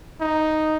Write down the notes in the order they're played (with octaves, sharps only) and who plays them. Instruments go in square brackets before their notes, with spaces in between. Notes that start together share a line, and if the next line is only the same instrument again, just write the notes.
[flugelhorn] D#4